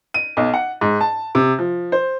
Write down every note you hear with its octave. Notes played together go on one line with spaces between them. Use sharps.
D#7
B1
F#5
G#2
A5
C3
F3
C5